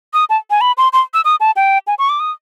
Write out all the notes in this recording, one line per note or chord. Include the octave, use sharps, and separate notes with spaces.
D#6
A5
G#5
B5
C6
C6
E6
D#6
A5
G5
G#5
C#6
D6
D#6